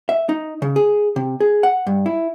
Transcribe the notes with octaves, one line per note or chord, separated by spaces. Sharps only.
E5
D#4
C#3
G#4
C3
G#4
F#5
G2
E4